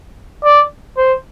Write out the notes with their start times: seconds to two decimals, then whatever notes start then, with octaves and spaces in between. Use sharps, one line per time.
0.44 D5
0.97 C5